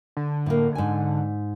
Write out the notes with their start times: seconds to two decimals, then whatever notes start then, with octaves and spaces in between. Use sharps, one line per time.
0.17 D3
0.46 A2 A#3
0.75 G#2 G#5